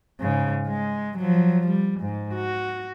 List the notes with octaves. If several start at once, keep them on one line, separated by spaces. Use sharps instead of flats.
G#2 C#3
G#3
F3 F#3
G3
G#2
F#4